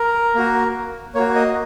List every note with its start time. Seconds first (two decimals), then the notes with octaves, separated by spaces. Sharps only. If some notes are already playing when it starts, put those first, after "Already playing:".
Already playing: A#4
0.35 A#3 F#4
1.15 A#3 F#4 C#5
1.35 D#5